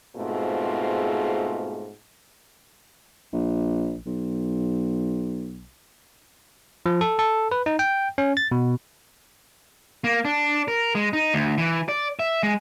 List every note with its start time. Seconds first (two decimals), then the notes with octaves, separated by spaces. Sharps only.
0.15 G#2 B2 A3 C4 F4 G#4
3.33 A#1
4.06 B1
6.86 F3
7.01 A4
7.19 A4
7.51 B4
7.66 D#4
7.79 G5
8.18 C#4
8.37 A6
8.51 B2
10.04 A#3
10.25 D4
10.68 A#4
10.95 G#3
11.13 D#4
11.34 D2
11.58 E3
11.89 D5
12.19 E5
12.43 G#3